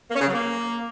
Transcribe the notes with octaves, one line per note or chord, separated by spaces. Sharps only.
A#3
C#4
C#3
F#3
A#3